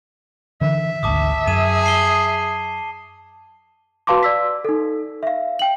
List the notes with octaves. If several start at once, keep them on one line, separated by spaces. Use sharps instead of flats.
D3 E3 E5
G#1 D2 A5 D6 D#6
F#2 G#4 A5 D#7 E7
A5 C7 G7
F#4 B4 F5 A5 C6 D6
D5 E6 B6
D#4 A4
E5 F5
G5 F#7